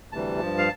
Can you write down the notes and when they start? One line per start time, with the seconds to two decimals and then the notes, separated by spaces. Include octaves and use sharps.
0.12 D2 C3 E3 G3 A5
0.40 G2 F3
0.58 F5